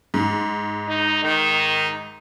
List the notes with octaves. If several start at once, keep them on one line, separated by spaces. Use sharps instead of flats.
G#2
D#4
D#3 D#4